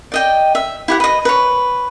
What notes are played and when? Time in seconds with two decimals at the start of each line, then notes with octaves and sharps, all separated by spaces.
0.12 D5 D#5 G5
0.55 E5
0.88 E4 G4 F#5
1.00 B4 D#5
1.25 B4 C#5